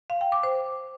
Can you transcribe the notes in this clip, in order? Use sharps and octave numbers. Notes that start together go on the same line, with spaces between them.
F5
G5
D6
C5